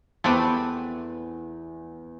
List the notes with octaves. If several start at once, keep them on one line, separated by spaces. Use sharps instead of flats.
E2 A3 C4 G4 B4